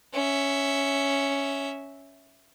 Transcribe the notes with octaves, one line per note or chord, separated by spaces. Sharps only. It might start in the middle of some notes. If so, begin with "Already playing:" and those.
C#4 E5